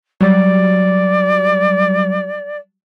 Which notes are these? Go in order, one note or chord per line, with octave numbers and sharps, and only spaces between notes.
F#3 G3 D5